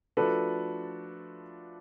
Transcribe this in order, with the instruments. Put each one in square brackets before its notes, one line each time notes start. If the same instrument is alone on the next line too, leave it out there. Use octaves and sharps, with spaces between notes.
[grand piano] F3 A3 D4 F#4 [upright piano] A4 B4